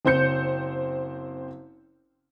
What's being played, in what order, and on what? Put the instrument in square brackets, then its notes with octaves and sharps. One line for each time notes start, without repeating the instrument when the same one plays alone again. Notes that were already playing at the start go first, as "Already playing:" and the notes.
[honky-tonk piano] F#1 C4 C5 G6 C#7